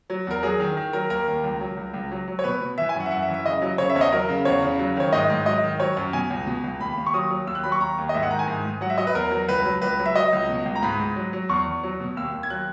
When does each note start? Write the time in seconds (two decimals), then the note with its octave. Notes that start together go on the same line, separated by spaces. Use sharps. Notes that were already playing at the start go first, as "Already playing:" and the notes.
0.10 F#3
0.27 E2 A#4
0.43 F#3 G#4
0.60 D#3
0.77 D#3
0.93 F#3 A#4
1.10 D#2 A#4
1.28 D#2
1.44 C#2
1.61 F#3
1.77 C#2
1.93 C#2
2.11 F#3
2.28 F#3
2.39 C#5
2.44 B2 B4
2.61 B2
2.78 E3 E5
2.89 G#5
2.95 F#2
3.00 F#5
3.06 E5
3.11 F#2 F#5
3.22 E5
3.28 E3
3.34 E5
3.45 C#3 D#5
3.62 F#3
3.78 C#3 C#5
3.90 E5
3.95 E2 C#5
4.01 D#5
4.12 F#3 A#4
4.29 C#3
4.45 E2 C#5
4.62 C#3
4.79 F#3
4.96 D#3 C#5
5.13 G#2 D#5
5.30 G#2
5.46 F#3 D#5
5.63 D#3
5.80 F#3 C#5
5.97 F#2
6.13 B2 G#5
6.30 C#2
6.47 B2
6.64 C#2
6.80 D#2 B5
6.98 D#2
7.06 C#6
7.14 F#3 D#6
7.31 F#3
7.47 D#2 E6
7.55 F#6
7.63 F#3 B5
7.72 C#6
7.80 D#2 A#5
7.98 D#2
8.09 D#5
8.14 G#2 E5
8.23 F#5
8.31 D#3 A#5
8.39 G#5
8.47 G#2
8.65 G#2
8.81 F#3 F#5
8.90 E5
8.98 F#3 D#5
9.07 B4
9.15 E2 A#4
9.31 F#3
9.48 C#2 B4
9.65 F#3
9.82 C#2 B4
9.99 F#3
10.06 E5
10.15 F#3 D#5
10.33 C#2
10.49 B2
10.65 C#2
10.76 A#5
10.82 G#2 B5
10.99 G#2
11.16 F#3
11.33 F#3
11.49 E2 C#6
11.66 E2
11.83 F#3
12.00 B2
12.17 D#2 E6
12.33 D#2
12.43 G#6
12.50 F#3 F#6